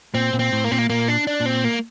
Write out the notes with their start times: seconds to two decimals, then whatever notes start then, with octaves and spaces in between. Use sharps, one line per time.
0.14 A#2 C4
0.33 A#2
0.39 C4
0.52 A2
0.64 A#3
0.71 A#2 C4
0.78 A#3
0.89 A#2 A#3
1.08 D4
1.27 D4
1.40 A#2
1.46 C4
1.64 A#3